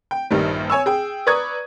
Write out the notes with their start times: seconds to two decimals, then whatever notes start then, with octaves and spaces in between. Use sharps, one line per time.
0.11 G5
0.30 A#1 G2 D#3 G3
0.70 C#5 G#5 C#6 E6
0.86 G#4 G5
1.27 B4 D5 A#5 C#6 D#6 G#6